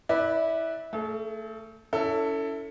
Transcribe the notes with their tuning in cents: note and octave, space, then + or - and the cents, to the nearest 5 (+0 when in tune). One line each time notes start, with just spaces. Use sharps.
E4 -20 B4 +0 D5 +10
A3 +25 A4 -45
C#4 +35 E4 +0 A4 +20